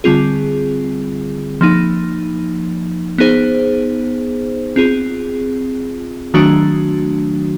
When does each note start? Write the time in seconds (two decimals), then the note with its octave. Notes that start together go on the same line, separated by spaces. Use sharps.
0.04 D3 G3 C4 F4 G#4
1.61 F3 A#3 D#4
3.18 B3 D#4 G#4 C5
4.76 C4 F4 G#4
6.34 D#3 F#3 A3 D4 F#4